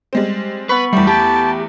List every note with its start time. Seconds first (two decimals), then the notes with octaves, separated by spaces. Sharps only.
0.13 G3 G#3 C4
0.69 B3 B4 B5 C#6
0.93 E2 G3 A3
1.07 G4 A5